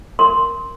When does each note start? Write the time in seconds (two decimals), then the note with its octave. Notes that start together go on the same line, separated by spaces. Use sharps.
0.19 A#4 C6